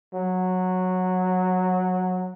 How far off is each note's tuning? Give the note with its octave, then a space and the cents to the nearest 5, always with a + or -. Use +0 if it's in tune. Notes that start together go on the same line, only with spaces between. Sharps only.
F#3 -10